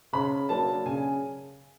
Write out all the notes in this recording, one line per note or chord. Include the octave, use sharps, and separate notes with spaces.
C#3 B5
F#3 A#3 D4 A5
C#3 G#5